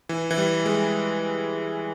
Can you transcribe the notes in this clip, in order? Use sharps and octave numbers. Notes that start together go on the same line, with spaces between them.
E3
E3
G3
G#3